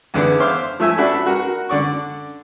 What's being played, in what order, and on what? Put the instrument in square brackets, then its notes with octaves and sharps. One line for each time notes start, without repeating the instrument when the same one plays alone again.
[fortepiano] E2 D3 B3 G#4
C5 E5 F5 C6 D6
F3 A3 E5 G#5 E6
D4 F#4 A4 D5 E5 B5
F#4 A#4
D3 D5 C#6